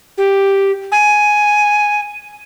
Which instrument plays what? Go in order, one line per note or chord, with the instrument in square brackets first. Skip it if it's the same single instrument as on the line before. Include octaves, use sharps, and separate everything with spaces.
[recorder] G4
G#5